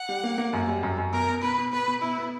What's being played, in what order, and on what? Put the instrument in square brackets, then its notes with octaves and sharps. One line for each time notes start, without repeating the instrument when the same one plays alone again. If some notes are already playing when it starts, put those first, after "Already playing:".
Already playing: [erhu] F#5
[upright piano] G3
A#3
A#3
F#2
G3
F#2
F#2
[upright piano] B2 [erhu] A#4
[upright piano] B2
[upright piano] B2 [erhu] B4
[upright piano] B2
[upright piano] B3 [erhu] B4
[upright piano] B2
[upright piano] B2 [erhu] E4
[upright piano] B3